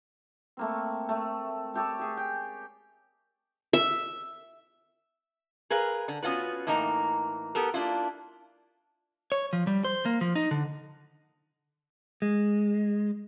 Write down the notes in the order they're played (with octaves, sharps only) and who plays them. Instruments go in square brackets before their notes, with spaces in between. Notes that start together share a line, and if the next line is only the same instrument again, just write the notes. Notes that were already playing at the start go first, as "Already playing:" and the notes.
[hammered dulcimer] A3 A#3 C4
A3
A3 G4 A4 C#5
G4 G#4
G5
[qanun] E5
[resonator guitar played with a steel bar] G#4 A#4 B4 F5
D3
B3 C#4 F4 F#4 B4
A2 E3 A#3 D#4 A#5
B3 G4 A4 A#4
A#3 D4 E4 F4
[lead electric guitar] C#5
F3
G3
C5
A#3
F3
D#4
D3
[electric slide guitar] G#3